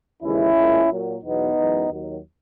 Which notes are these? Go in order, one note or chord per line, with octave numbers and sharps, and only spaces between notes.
D#2 C#3 E3 G#3 C#4 E4
A#2 G#3
A#2 F#3
E2 B2 F#3 B3 D#4
F#2 E3 G#3
D#2 D#3 F#3